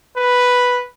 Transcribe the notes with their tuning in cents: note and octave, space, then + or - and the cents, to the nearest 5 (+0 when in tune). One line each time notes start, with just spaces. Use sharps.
B4 +0